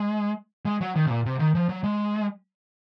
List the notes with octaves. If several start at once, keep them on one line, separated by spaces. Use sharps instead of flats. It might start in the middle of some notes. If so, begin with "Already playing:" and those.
Already playing: G#3
G#3
F#3
D#3
C3
A#2
C3
D#3
F3
F#3
G#3